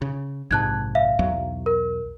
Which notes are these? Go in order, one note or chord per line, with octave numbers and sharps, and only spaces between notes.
C#3
A#1 G#2 C3 A5 F#6 G#6
E5 F5
B1 E2 F#3
A#4